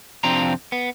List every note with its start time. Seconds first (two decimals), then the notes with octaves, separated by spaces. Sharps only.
0.24 F2 C3 C4 D4 F4 A#5
0.72 B3